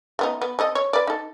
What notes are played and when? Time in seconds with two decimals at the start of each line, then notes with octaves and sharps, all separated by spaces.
0.19 A3 B3 D#4
0.41 B3
0.59 C4 A4 D#5
0.75 C#5
0.93 B4 D5
1.07 D#4 A4